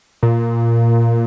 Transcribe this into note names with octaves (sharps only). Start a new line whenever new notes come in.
A#2